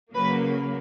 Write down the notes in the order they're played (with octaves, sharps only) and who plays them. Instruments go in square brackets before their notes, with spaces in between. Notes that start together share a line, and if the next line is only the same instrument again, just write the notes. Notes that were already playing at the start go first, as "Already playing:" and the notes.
[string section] C#3 F#3 A#3 B4